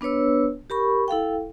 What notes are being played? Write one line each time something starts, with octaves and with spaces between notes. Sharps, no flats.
B3 D4 B4 C#5 E6
G4 A#4 B5 C#6
E4 A4 F5 G5